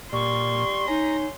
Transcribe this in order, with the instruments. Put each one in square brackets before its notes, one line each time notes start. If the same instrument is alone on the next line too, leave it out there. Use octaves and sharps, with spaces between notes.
[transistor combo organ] A#2 [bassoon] G3 [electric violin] C6 [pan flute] C#6
[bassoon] C#4 [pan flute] D#4 [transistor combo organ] A#5